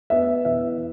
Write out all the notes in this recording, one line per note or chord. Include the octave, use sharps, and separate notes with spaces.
B3 E5
E2 E5